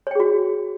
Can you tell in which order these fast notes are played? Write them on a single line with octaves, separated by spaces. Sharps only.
C#5 G5 G#4 F#4